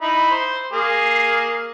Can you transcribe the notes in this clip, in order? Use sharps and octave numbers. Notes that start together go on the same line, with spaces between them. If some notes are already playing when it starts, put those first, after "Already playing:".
D#4 E4 B5
C5
A#3 G#4